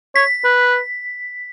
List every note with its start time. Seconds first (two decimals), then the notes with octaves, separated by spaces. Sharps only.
0.15 C#5 B6
0.44 B4